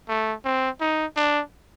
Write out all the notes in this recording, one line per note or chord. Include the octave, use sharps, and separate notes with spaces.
A3
C4
D#4
D4